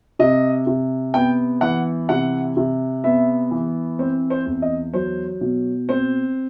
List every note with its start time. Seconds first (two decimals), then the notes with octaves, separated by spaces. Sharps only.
0.19 C3 D#5
0.67 C3
1.14 B3 G5
1.61 E3 F#5
2.09 C3 F#5
2.57 C3
3.04 B3 E5
3.51 E3
3.99 C4 C5
4.30 C5
4.46 E2
4.62 D#5
4.94 F#3 C5
5.41 B2
5.89 C4 C5